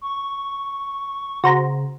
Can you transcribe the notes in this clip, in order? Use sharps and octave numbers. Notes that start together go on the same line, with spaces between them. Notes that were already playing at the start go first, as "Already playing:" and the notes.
C#6
C#3 F#4 C5 A#5